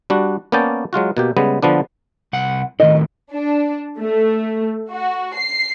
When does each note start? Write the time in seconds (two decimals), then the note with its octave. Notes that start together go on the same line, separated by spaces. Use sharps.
0.10 G3 D4 F#4
0.52 A#3 B3 C#4 D5 G5 A5
0.93 F#3 G#3 F4 F#4
1.17 B2 A#3 G4
1.37 C#3 G3 G#3 B3
1.63 D3 F3 B3 D4
2.33 C2 F#5
2.80 A2 D#3 D#5
3.32 D4
3.99 A3
4.90 F#4
5.35 C7